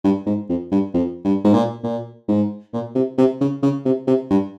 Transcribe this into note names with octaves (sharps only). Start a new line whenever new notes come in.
G2
G#2
F2
G2
F2
G2
G#2
A#2
A#2
G#2
A#2
C3
C3
C#3
C#3
C3
C3
G2